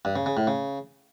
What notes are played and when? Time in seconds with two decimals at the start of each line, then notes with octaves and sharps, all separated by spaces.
0.05 G2
0.16 C#3
0.26 C#3
0.37 A2
0.47 C#3